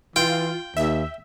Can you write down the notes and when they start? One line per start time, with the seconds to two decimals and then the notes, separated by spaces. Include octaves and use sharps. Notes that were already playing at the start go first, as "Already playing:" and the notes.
0.16 E3 F4 G5
0.77 D#2 E5